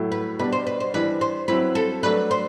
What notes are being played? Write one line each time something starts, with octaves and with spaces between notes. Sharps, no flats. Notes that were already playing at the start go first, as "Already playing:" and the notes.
Already playing: A2 F#3 A3 E4
B4
B2 G3 D4 B4
C5
B4
C5
E3 G3 D4 B4
C5
F#3 C4 E4 B4
A4
F#3 A3 D4 B4
C5